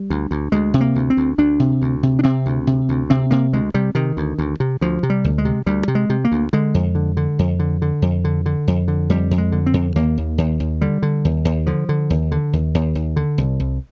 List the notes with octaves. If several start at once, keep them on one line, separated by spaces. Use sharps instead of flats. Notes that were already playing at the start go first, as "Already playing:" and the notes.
Already playing: G3
D2
D2
D2 G#3
C3
A#3
D2
C4
D2
D2 D4
C3
D2
C3
D4
C3 C4
D2
C3
D2
C3 C4
C3 A#3
D2 G#3
C3 G3
C3 D#3
D2
D2
C3
D2 F3
C3
G3
D2
G#3
C3
D2 G3
C3
G#3
C3
A#3
D2
D3 G#3
F2
D3
D3
F2
D3
D3
F2
D3
D3
F2
D3
F2 G3
F2
G#3
D3
C4
F2
D#2 A#3
D#2
D#2
D#2
D3 G3
D3
D#2
D#2
D3 F3
D3
D#2
D3
D#2
D#2
D#2
D3
C2
C2